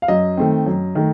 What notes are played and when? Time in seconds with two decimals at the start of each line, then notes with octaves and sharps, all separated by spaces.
0.02 F5
0.08 F#2 D#5
0.37 D#3 A3 C4
0.66 F#2
0.95 D#3 A3